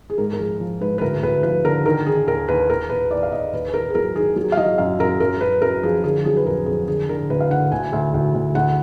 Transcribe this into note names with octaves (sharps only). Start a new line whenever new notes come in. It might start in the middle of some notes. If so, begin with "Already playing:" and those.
G#4
G#2 A#4
A#4
F3 G#4
F3
G#2 B4
B4
D2 A#4
D2 B4
F3 B4
D3 A#4
D#3 A#4
D#3 G#4
D#2 A#4
D#2 B4
D#2 A#4
D#2 B4
D#2 D5
F5
D#2 D#5
D#2 B4
B4
D#3 A#4
G#4
F#3 A#4
D#3 G#4
F#3 G#4
F5
F#3 D#5
F#2 F5
F#2 A#4
F#2 A#4
F#2 B4
F#2 A#4
F3 G#4
D3 G#4
F#3 G#4
B4
F2 A#4
F2 G#4
D3 G#4
D3 A#4
D2 B4
F5
D3 F#5
D2 G#5
D2
D2
D2
D2 F#5